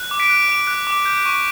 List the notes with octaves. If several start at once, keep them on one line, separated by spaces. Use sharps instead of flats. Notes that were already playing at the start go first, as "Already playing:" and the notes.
Already playing: F#6
D6
B6 D7
F#6
D6
F#6
D6
G6
C#6